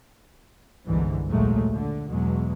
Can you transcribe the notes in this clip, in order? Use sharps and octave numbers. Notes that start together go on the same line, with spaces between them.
G1 C2 G#2 D3 E3
A#1 D#2 A#2 F#3 G#3 A3
D3
E2 B2 F#3 G#3